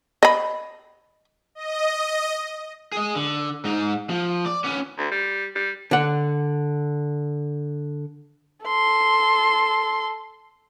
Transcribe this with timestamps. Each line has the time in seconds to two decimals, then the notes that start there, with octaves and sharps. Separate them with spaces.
0.23 D#5 B5
1.55 D#5
2.92 G#4 D#5
3.15 D3
3.64 G#2 D#4
4.10 F3
4.46 D5
4.64 B3 C#4
4.98 D2
5.12 G3
5.55 G3
5.91 D3 F#5
8.66 A4 C6